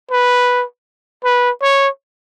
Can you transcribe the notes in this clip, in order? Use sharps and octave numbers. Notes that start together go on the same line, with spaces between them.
B4
B4
C#5